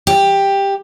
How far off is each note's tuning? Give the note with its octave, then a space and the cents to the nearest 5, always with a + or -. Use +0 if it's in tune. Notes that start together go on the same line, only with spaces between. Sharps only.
G4 +10